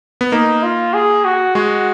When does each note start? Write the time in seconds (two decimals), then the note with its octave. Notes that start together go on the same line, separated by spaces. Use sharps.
0.21 B3
0.32 A#3 D#4
0.63 F4
0.94 G#4
1.25 F#4
1.55 G#3 F#4